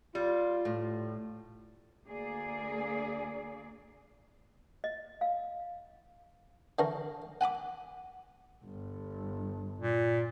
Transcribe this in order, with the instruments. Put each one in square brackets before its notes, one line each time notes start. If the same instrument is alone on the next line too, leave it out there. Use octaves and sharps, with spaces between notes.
[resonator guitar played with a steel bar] G3 [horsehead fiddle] F4
[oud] A2
[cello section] D2 A#3 G#4 D5
[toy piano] D#5
F5
[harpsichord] D3 E3 A#4 C#6
F#5 G#5 B5 D6
[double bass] G1
[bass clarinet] A#2